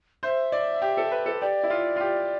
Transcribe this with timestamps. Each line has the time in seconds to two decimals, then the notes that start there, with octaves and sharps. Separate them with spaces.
0.23 C5 E5
0.52 D5
0.82 G4
0.97 A4
1.12 B4
1.26 A4
1.41 G4 D5
1.63 E4
1.70 F4
1.96 F4
2.00 G4